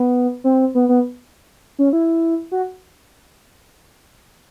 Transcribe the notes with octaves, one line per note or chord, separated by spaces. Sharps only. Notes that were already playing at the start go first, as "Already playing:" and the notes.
Already playing: B3
C4
B3
B3
C#4
E4
F#4